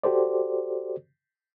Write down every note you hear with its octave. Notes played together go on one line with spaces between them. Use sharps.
F#4 G4 A4 C5 D5